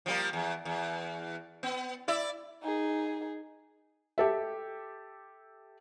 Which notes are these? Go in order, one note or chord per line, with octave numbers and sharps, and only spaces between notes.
F3 G3 A#3
E2
E2
B3
E4 D5 E5
D#4 G#4
G4 A4 E5